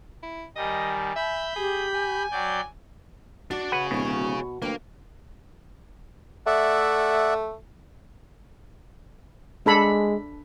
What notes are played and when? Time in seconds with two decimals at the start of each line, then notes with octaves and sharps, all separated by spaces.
0.23 E4
0.56 D#3 G3 D#5 G#5
1.16 E5 B5 G6
1.56 G4 G#4
1.94 G#5
2.31 F#3 D5 G5 G6
3.51 D4 F#4 D5
3.72 G#4 B4 C#5 F#5
3.91 D1 B2
4.62 D2 A#3 B4 G5
6.46 A3 D5 E5 F#5
9.66 G#3 D4 A4 B5